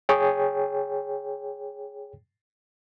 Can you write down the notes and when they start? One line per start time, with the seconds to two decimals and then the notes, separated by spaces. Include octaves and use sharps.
0.09 G#4 C#5 G5